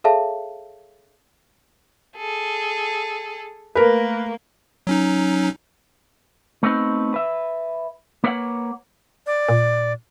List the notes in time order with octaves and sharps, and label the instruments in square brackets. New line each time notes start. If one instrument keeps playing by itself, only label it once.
[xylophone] G#4 A4 C#5 E5 F5 A5
[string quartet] G#4 A4
[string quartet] A3 A#3 [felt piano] A#4 B4
[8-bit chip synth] F#3 C#4 D#4
[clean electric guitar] A3 B3 C4 D#4 B4
B4 E5
A#3 B4 C#5 E5 F#5
[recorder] D5
[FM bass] A#2